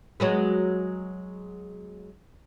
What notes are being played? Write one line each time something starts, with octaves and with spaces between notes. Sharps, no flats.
F#3 G#3 B3